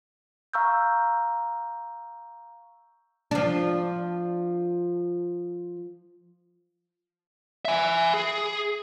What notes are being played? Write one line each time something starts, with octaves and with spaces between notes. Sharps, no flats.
F5 A#5 C#6 E6 F6 G6
F3 D4
E5 G#5
G#4